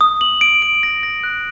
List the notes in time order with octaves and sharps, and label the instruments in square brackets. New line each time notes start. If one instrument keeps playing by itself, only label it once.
[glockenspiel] D#6
F#7
D7
D7
A#6
A#6
F#6